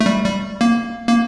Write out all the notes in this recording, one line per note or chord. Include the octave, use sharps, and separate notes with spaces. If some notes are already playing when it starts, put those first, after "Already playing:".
A3
G3
G3
A#3
A#3